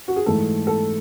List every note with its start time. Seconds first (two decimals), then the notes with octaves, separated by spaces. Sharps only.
0.08 F#4
0.16 G#4
0.26 G#2 E3 A3 A4
0.67 A4